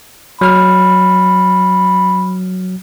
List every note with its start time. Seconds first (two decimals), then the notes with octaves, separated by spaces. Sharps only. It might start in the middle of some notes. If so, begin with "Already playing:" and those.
0.41 F#3 B5 F6